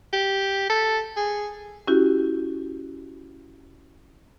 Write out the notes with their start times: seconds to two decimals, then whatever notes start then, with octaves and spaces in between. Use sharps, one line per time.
0.13 G4
0.70 A4
1.16 G#4
1.87 C#4 E4 F#4 G4